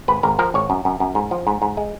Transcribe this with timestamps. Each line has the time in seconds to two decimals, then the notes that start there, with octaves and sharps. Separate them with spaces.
0.08 G#1 B4
0.23 G#1 A#4
0.39 F3 A#4
0.54 G#1 C#5
0.70 F#2
0.85 F#2
1.00 F#2
1.15 G#2
1.31 F3
1.47 G#2
1.62 G#2
1.77 G#3